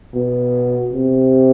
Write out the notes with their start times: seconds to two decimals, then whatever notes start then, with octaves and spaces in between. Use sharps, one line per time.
0.14 B2
0.93 C3